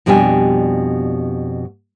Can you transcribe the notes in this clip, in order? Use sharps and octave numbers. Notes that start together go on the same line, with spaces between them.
F2 B2 G3 D4 G4 G#5